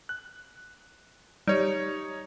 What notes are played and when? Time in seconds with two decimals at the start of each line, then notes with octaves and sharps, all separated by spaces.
0.09 F#6
1.48 G3 D#4 C#5